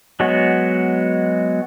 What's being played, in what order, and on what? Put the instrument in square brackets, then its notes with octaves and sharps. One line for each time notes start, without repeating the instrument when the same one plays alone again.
[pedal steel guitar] F#3 G#3 B3 F#4